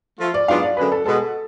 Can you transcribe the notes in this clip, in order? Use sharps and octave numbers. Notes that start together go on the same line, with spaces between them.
F3 A3 F4
D5
G#2 F#3 B3 D4 F4 F5
D5
F#2 D3 G#3 B4
A4
B2 G#3 B3 A4